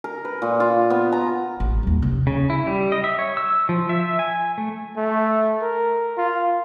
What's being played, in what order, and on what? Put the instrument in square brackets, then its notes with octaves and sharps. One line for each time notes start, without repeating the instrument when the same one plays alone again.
[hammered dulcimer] A#4
B4
A#2
F4
B3
A#5
[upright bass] A1
D#2 G3
C3
[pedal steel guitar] C#3
E4
G3
D#5
E5
C#5
E6
F3
E5
G#5
A3
[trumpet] A3
A#4
F4